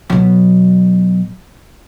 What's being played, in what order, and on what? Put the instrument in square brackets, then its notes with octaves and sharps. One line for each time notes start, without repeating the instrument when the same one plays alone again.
[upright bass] B2 F#3